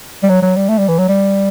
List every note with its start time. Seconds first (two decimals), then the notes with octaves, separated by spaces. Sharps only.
0.23 G3
0.29 F#3
0.42 F#3
0.56 G3
0.69 A3
0.79 G3
0.88 E3
0.98 F#3
1.08 G3